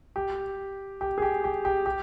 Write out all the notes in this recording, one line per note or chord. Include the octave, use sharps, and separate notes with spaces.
G4
G4
G#4
G4
G4
G4
G4